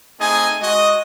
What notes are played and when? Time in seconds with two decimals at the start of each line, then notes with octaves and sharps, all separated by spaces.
0.19 A3 C4 D#4 G#4 D#5 G#5
0.61 G#3 F#4 D#5